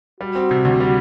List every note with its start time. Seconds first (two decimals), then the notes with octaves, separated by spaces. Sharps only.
0.20 G3 F#4
0.35 C4
0.51 C3
0.65 D2
0.80 G3